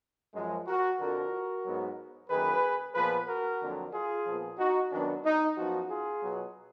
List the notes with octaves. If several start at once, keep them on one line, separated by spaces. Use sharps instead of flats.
F#2 F3 G#3
F#4 A#4
F2 D3 F3 F#4 A#4
G#2 F#3 B3
F#2 D#3 A#3 G#4 B4
A#2 F3 B3 G#4 B4
F#4 A#4
F2 D3 F#3 A#3
F4 G#4
A#2 F3 B3
D#4 F#4
F#2 D#3 F#3 B3 D4
D#4
F#2 F3 B3 D#4 F#4
F4 G#4
B2 F#3 B3